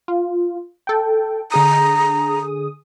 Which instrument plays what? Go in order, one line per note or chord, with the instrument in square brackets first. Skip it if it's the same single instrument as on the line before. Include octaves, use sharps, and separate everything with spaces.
[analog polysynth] F4
A4 G5
[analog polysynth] D3 G#4 D#6 [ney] A#5